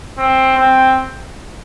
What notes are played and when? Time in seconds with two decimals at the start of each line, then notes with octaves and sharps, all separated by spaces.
0.18 C4
0.57 C4